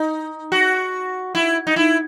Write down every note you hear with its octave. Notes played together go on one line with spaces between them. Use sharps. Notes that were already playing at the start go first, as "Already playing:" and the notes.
Already playing: D#4
F#4
E4
D#4
E4